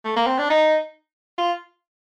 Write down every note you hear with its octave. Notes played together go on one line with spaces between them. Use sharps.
A3
A#3
C4
D4
D#4
F4